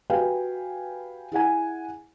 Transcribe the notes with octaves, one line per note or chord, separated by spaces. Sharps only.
F#4 G4 B4 F5 G5 G#5
E4 G#4 F#5 G#5